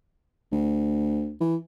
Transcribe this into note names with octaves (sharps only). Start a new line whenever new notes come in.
D2
E3